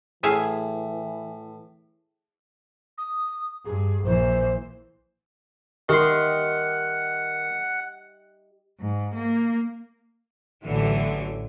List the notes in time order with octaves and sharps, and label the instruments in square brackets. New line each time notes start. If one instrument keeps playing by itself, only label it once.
[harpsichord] A2 [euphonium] E3 [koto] G#4 E5 F5
[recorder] D#6
[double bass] G2 [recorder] G#4
[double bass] A#1 E3 [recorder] C5
[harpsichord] D#3 C6 [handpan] G4 D#5 E5 [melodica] F#5
[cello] G#2
A#3
[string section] A1 A2 D3 E3 F#3